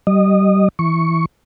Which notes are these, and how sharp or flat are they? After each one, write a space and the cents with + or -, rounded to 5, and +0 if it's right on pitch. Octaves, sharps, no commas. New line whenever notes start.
G3 -25 D#5 -20
E3 +0 C#6 +0